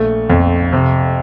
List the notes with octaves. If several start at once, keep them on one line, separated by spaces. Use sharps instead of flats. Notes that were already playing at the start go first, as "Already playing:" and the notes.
Already playing: A#1 A3
F2
C3